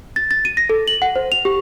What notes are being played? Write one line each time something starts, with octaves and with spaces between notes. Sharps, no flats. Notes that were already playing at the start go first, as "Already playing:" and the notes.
A6
A6
D#7
A#6
A4
F#7
F#5
C5
F7
G4